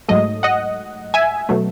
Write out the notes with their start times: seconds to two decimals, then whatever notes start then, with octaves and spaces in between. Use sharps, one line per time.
0.08 G#2 F#3 A3 D#5
0.43 D#5 F#5
1.14 E5 G#5
1.49 B2 F#3 A3